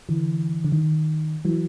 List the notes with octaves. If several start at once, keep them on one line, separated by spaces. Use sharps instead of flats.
D3 E3
D3
D#3
E3 F#3